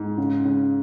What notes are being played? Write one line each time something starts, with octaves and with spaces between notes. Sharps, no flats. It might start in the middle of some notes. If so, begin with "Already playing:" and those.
Already playing: G#2
C#3
C#3